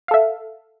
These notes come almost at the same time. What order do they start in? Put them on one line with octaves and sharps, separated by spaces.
F5 A4 E5